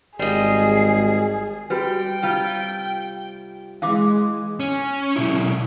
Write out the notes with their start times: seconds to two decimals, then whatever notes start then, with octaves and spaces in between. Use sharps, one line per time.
0.19 G#1 G3 G#4 D#5 C7
1.70 G3 F#4 B4 G5
2.22 C3 G3 F4
3.82 E3 G#3 F5 D6
4.60 C#4
5.17 B1 E4